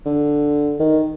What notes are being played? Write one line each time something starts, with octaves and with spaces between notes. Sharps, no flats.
D3
D#3